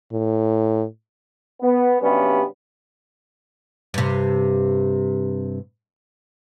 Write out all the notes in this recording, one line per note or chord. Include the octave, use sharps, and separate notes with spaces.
A2
B3
G2 C3 F#3 G3 B3 C#4
G2 C3